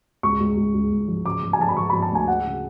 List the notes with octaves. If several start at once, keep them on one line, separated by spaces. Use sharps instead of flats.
C#2 C#6
C#2
C#2
C#2
C#2
F3
C#3 D6
F3
G#5
F3 A5
B5
F3 C#6
F3 B5
A5
D2 G#5
G#3 F#5
C#3